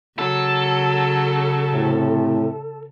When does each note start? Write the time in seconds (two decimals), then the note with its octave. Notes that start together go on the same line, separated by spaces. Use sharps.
0.19 C#3 F#3 A4
1.72 A2 C3